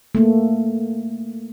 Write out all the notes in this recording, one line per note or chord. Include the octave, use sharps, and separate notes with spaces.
A3 A#3